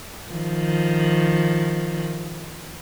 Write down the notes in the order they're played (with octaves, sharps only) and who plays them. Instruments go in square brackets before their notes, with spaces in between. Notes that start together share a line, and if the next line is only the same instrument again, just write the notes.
[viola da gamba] D#3 F3